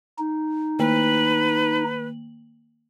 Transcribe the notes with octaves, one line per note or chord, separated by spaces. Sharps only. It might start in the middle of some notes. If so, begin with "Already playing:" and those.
D#4
D#3 A#3 B4 F#7